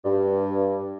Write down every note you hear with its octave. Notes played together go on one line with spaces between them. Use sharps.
G2